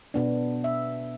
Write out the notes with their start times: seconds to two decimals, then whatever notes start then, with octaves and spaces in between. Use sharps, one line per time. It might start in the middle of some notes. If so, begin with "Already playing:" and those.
0.14 B2 B3 D4
0.64 E5